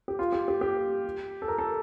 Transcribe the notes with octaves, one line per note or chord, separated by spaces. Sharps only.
G4
F4
G4
G4
G4
A4
A#4
A4